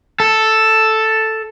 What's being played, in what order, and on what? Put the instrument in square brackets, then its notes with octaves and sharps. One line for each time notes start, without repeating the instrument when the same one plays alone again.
[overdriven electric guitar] A4